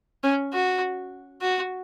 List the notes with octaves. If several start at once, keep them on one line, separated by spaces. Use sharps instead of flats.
C#4
F#4
F#4